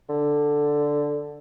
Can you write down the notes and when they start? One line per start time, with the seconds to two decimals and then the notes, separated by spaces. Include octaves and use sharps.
0.09 D3